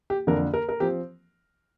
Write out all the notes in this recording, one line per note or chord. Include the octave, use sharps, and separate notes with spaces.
G4
F2 D3 A#3 D4 A#4
A#4
A#4
F3 C4 G4